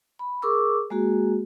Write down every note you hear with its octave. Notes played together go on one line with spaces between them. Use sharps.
B5
G#4 A#4 C#6 D6 E6
G#3 A#3 F#4 G#4